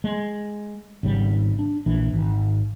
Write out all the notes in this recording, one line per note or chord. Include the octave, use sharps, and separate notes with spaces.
G#3
G#1 C#3 G3
D4
A#1 E3 D4
G#1